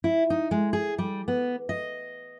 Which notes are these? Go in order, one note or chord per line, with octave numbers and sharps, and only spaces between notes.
E4
D#4
G#3
G#4
G3
B3
D#5